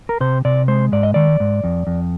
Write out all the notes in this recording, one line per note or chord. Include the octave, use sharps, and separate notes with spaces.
A#4
C3 C5
C3 D5
G#3 C5
G#2 D5
D#5
D#3 D5
G#2
F2
F2